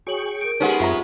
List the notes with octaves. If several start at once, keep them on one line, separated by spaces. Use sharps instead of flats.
F#4 G#4 C#5 G5 C#6 F#7
A#4 D7
G#3 B3 C#4 D#4 G4 F#5
F#2 C4 F4 E5 A#5